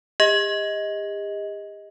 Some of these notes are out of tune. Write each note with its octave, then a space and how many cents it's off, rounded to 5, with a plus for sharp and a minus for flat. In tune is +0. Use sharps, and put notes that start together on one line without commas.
G4 +45 D#5 +15